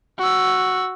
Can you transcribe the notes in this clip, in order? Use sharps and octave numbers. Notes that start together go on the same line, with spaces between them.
F#4 E6